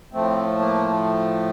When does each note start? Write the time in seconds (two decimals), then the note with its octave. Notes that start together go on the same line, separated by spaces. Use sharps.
0.13 A2 F3 A3 C4
0.59 A#3